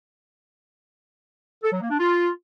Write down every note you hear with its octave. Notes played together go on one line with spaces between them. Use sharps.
A4
F#3
A#3
D4
F4